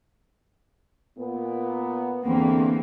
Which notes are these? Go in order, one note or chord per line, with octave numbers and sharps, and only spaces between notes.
A#2 B3
E2 D3 A#3 C4